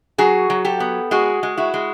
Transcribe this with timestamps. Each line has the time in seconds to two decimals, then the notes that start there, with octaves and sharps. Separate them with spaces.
0.18 F#3 F#4 G#4
0.50 F#3
0.65 G4 A4
0.80 B3
1.11 G#3 F#4 G#4
1.43 G#3
1.57 E4 F#4
1.74 G#3